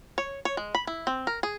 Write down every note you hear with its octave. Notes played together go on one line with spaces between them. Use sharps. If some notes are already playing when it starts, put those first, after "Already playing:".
C#5
C#5
G#3
B5
E4
C4
A#4
G#4